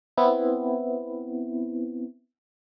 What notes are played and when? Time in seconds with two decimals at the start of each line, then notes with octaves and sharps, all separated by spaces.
0.17 B3 C4 E4